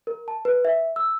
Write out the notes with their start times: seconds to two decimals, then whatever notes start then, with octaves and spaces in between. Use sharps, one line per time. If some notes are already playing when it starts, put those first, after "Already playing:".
0.07 A#4
0.28 A5
0.45 B4
0.65 E5
0.96 E6